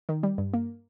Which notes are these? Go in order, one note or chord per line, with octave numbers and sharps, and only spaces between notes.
D#3
G3
G2
A#3